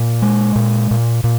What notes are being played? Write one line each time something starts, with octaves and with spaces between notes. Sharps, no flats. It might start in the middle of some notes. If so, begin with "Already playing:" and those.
Already playing: A#2
G#3
A#2
A#2
A#2